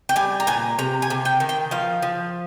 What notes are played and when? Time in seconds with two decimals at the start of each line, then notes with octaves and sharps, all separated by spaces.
0.09 G5
0.16 G3 G#5
0.40 A#5
0.47 A#2 G#5
0.79 C3 A#5
1.02 G#5
1.10 C3
1.25 G5
1.40 D#3
1.49 G5
1.71 F3 F5
2.02 F3